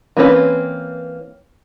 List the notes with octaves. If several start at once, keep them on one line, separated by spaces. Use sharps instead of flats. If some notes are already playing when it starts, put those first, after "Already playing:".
E3 A#3 C4 C#4 B4